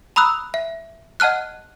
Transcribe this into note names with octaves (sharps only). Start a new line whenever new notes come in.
A#5 B5 D#6 E6 F#6
E5
D#5 F#5 A5 F6 F#6